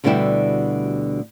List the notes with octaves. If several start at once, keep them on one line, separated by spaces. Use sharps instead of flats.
D2 B2 D3 G3 E4 G4